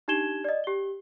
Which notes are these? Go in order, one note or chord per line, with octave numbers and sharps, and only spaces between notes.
D4 D#4 G4 G#6 E7 G7
D5 D#5
G4 G7